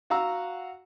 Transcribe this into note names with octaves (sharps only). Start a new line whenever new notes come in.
F#4 F5 F#5 A#5 E6